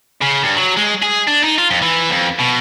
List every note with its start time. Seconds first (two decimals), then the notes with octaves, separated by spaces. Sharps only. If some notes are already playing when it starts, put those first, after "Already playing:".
0.21 C#3
0.43 G2
0.57 F#3
0.77 G#3
1.02 G#4
1.27 D4
1.43 D#4
1.58 F4
1.71 F2
1.82 E3
2.10 F2
2.39 B2